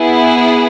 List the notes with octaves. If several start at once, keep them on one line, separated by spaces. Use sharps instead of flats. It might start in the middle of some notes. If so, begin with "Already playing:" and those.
Already playing: B3 E4 G#4